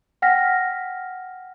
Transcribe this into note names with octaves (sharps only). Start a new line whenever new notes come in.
F#5 G5 F6 A#6 B6